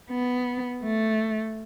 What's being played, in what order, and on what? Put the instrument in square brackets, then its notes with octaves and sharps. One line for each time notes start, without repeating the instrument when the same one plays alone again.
[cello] B3
A3